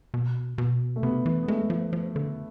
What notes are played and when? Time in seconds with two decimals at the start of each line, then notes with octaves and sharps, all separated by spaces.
0.14 B2
0.58 B2
0.96 A3
1.03 C3 B3
1.26 E3
1.43 B3
1.48 G#3 A3
1.70 F3
1.93 F3
2.16 D3